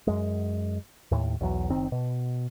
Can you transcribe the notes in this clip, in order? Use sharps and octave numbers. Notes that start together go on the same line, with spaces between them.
F#2 G#3
D#2 A2
B1 E2 F#3
F#1 D#3 C4
B2